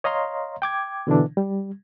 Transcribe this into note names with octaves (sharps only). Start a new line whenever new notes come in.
C#5 D#5 F5 A#5 C6
G5 D6 G#6
B2 D3 E3 D4
G3